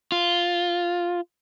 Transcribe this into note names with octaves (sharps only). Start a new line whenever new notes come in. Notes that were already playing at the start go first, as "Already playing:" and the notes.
F4